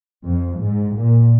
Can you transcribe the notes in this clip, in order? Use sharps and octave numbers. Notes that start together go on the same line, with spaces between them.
F2
G#2
A#2